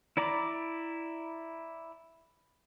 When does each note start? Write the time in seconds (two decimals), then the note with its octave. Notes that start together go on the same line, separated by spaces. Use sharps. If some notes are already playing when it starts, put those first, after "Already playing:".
0.17 E4 D5 A#5 B5 D6